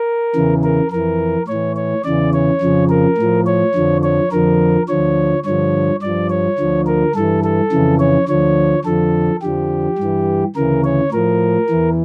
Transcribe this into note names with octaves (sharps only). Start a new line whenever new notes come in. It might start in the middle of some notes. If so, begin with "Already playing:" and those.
Already playing: A#4
E2 C#3 E3
A#4
F2 E3 A#4
A2 E3 C#5
C#5
E2 C#3 E3 D5
C#5
F2 C#3 F3
A#4
A2 F3
C#5
F2 D3 F3
C#5
F2 D3 F3 A#4
D2 D3 F3 C#5
G2 D3 F3 C#5
G2 F3 D5
C#5
D2 D3 F3
A#4
G2 E3 A4
A4
F2 C#3 E3
C#5
D2 D3 F3 C#5
F2 D3 F3 A4
F2 D3 F3 G4
G2 E3
D2 C#3 E3 A#4
C#5
A2 F3 A#4
E2 E3